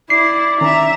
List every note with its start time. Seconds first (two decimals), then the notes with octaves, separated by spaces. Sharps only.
0.10 E4 D5 C7
0.61 D#3 C#4 E5 A#5